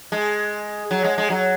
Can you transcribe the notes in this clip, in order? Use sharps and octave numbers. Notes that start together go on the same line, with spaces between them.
G#3
F#3
G#3
G#3
F#3